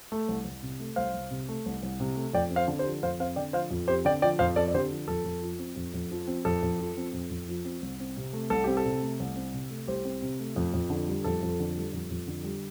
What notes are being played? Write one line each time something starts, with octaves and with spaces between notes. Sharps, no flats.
A3
C2
C2
C3
A3
C2 C5 F5
C2
C3
A3
C2
C2
C3
A3
F2 D5 G5
C4
C5 F5
D3
G4 C5
F3
F2 C5 F5
C4 C5 F5
D3 D5 G5
F3 C5 F5
F2
C4 G4 C5
D3 D5 G5
F3 D5 G5
F2 C5 F5
C4 A4 D5
D5
D3 G4 C5
F3
F2 A4
F2
F3
C4
F2
F2
F3
C4
F2 A4
F2
F3
C4
F2
F2
F3
C4
C2
C4
C3
A3
C2 A4
C4 G4
A4
C3
A3
C2
C4
C3
A3
C2 G4 C5
C4
C3
A3
F2
F2
D3
G3
F2 A4
F2
D3
G3
F2
F2
D3
G3